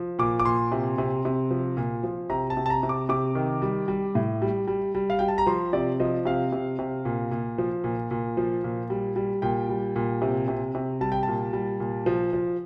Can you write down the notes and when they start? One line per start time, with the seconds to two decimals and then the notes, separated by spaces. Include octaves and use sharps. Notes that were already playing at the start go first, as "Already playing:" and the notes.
Already playing: F3
0.19 A#2 D6
0.39 D6
0.45 A#2 C6
0.72 C3
0.98 C3
1.25 C3
1.51 F3
1.77 A#2
2.03 F3
2.30 C3 A#5
2.50 A5
2.57 C3
2.66 A5
2.70 A#5
2.83 C3
2.89 D6
3.09 C3 D6
3.35 D#3
3.62 G3
3.88 G3
4.15 A2
4.42 G3
4.68 G3
4.95 G3
5.10 F5
5.19 G3 G5
5.28 A5
5.38 A#5
5.46 F3 C6
5.73 C3 D5
6.00 F3 D#5
6.25 C3 F5
6.52 C3
6.79 C3
7.05 A#2
7.31 A#2
7.58 F3
7.84 A#2
8.11 A#2
8.37 F3
8.64 A#2
8.90 G3
9.16 G3
9.42 A#2 G5
9.69 G3
9.96 A#2
10.22 C3
10.48 C3
10.75 C3
11.01 G3 A5
11.12 G5
11.23 A#2 A5
11.53 G3
11.80 A#2
12.06 F3
12.33 F3